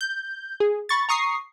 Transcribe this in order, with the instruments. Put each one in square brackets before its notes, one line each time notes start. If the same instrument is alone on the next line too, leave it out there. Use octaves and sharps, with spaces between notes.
[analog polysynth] G6
G#4
B5 C#6 A6
A#5 C#6 D#6 C7